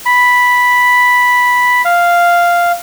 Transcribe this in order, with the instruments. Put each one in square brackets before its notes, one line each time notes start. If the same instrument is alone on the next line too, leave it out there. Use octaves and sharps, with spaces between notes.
[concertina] B5
F5